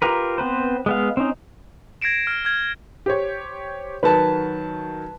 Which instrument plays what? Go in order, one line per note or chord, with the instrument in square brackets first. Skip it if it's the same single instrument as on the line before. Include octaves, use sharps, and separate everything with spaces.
[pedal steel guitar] F4 G4 A#4 B4
B3 C4 B4 C5
G#3 B3 F5
C4 C#4 D#4
[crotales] G#6 A#6 C7 D7 E7
F6
F6 G#6
[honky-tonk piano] G4 C5 C#5
[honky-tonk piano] D#3 F#3 [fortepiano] B4 A5